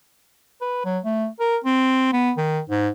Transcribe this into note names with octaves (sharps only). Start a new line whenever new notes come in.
B4
F#3
A3
A#4
C4
B3
D#3
G#2